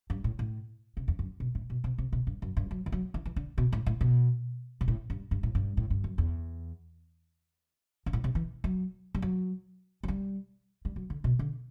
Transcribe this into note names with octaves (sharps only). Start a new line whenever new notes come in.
G2
A2
A2
C3
E2
F#2
B2
A2
B2
C3
C3
B2
G2
F#2
G2
F#3
E3
F#3
E3
E3
D3
B2
A2
A2
B2
B2
A2
G2
G2
A2
G2
A2
G2
F#2
E2
G2
A2
C3
E3
F#3
G3
F#3
F#3
G3
G3
F#3
D3
B2
D3